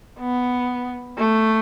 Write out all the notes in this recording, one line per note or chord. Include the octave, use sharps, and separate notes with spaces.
B3
A3